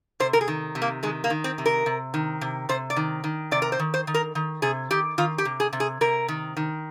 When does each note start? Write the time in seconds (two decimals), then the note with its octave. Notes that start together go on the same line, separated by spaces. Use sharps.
0.20 C3 C5
0.33 A#4
0.41 G#4
0.48 D#3
0.75 C3
0.82 A#3
1.03 D#3 G#3
1.24 A#3
1.30 D#3
1.44 C4
1.58 C3
1.66 A#4
1.86 C3
2.14 D#3
2.41 C3
2.69 C3 C5
2.90 D5
2.96 D#3
3.24 D#3
3.51 C3 D5
3.62 A#4
3.72 C5
3.79 D#3
3.94 C5
4.07 D#3
4.14 A#4
4.35 D#3
4.62 C3 G#4
4.91 D#3 G4
5.18 D#3 F4
5.38 G4
5.45 C3
5.60 G#4
5.73 C3
5.80 G#4
6.01 C3 A#4
6.28 D#3
6.57 D#3